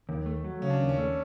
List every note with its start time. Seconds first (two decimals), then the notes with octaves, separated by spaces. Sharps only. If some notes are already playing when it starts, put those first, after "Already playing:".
0.09 D#2
0.26 A3
0.44 F#3
0.62 C#3 C#4
0.70 D4
0.75 C#4
0.80 D#2
0.89 C#4
0.98 A3